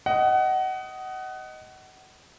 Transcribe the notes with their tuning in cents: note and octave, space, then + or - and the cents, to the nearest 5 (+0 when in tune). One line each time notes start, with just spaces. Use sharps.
D#5 +5 F#5 +25